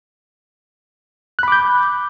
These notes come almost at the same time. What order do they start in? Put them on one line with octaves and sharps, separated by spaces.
F#6 B5 D6 G6